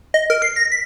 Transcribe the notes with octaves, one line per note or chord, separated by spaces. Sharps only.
D#5
A#4
C7
A#6
B6